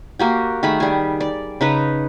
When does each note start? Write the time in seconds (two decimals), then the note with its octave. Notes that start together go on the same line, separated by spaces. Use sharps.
0.19 A#3 F#4 G4
0.63 D#3 A3 G#4 B5
0.80 G3 G#4
1.20 D5
1.61 C#3 D#4 B4